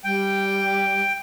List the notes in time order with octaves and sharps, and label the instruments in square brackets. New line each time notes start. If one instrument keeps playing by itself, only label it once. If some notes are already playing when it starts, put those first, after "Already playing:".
[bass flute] G3 [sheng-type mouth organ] G5